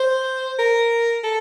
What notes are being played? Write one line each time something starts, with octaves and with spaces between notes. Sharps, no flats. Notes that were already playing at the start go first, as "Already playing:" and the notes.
Already playing: C5
A#4
A4